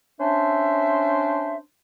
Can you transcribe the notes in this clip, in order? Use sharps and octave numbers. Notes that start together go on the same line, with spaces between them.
C#4 D4 C5 E5